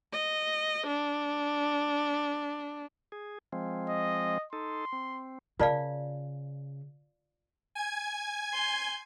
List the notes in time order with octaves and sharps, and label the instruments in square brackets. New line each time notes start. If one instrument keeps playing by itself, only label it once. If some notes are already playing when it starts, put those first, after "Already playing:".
[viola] D#5
D4
[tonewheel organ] G#4
F3 G#3 C4
[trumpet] D#5
[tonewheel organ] D#4 A4 [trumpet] C6
[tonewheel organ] C4
[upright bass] C#3 [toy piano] F4 D5 F5 [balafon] A#4 A5
[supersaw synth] G#5 G#6
[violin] C6 G6